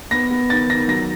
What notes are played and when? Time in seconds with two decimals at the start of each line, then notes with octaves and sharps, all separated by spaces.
0.11 B3 A#6
0.30 B3
0.50 D#3 A6
0.70 D#3 A#6
0.88 F#3 A#6